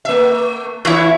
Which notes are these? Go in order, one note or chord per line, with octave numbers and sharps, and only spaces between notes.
A3 E5
E2 E4 F4 C#5